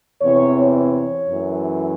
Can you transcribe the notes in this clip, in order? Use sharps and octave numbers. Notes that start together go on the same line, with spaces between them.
E2 C3 E3 C4 C#5
C#5
F#2 E3 A3